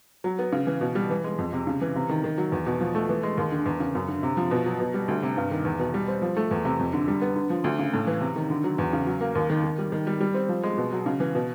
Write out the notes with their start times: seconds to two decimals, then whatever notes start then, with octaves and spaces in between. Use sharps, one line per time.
0.24 F#3
0.39 B3
0.53 C#3
0.67 E3
0.81 B2
0.95 G3
1.10 E3
1.24 G#3
1.38 F2
1.53 C3
1.67 C#3
1.81 E3
1.96 C3
2.09 D#3
2.24 D#3
2.38 F#3
2.52 E2
2.66 B2
2.81 F3
2.95 A3
3.09 E3
3.23 G#3
3.37 D#2
3.52 D3
3.66 E2
3.80 C#3
3.95 F#2
4.08 D3
4.23 C3
4.37 F3
4.51 B2
4.66 F#3
4.80 B2
4.94 G3
5.08 D2
5.23 C3
5.37 G2
5.51 D#3
5.65 E2
5.79 B2
5.94 G3
6.08 C4
6.22 F3
6.37 A3
6.51 E2
6.65 C3
6.79 F2
6.93 D3
7.08 G3
7.22 B3
7.36 D3
7.50 F3
7.64 D2
7.79 C#3
7.93 A2
8.07 E3
8.21 C3
8.36 D#3
8.50 D3
8.64 F#3
8.78 E2
8.93 C#3
9.07 F#3
9.21 A#3
9.35 D#2
9.50 D#3
9.64 D#3
9.78 G3
9.92 D#3
10.07 G3
10.20 G3
10.34 C4
10.49 F3
10.63 G#3
10.78 B2
10.92 F#3
11.06 C#3
11.20 E3
11.35 B2